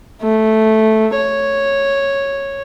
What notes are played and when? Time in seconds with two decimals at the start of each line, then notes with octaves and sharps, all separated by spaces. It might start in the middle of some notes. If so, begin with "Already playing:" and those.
0.22 A3
1.16 C#5